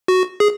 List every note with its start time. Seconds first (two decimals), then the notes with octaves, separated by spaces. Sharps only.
0.08 F#4
0.40 G#4